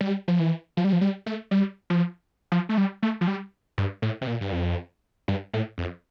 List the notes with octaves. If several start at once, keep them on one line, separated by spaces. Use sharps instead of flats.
G3
F3
E3
F3
G3
F3
G3
A3
G3
F3
F3
A3
G3
A3
F3
G3
G2
A2
C3
A#2
G2
F2
G2
A2
F2